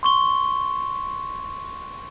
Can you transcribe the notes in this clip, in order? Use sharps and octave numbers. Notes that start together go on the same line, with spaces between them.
C6 C#6 G7